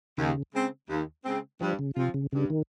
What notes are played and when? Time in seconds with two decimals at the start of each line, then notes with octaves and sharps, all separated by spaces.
0.18 D#2 C#3
0.54 C#3 G#3 C4
0.89 D#2
1.25 C#3 G#3 C4
1.61 G2 F3
1.79 C#3
1.96 C3 F3 C4 F4
2.14 C#3
2.33 G2 C#3
2.50 D#3